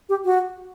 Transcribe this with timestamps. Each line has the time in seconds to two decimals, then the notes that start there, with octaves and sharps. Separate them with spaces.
0.09 G4
0.25 F#4